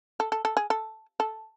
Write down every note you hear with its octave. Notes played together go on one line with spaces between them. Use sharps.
A4
A4
A4
G#4
A4
A4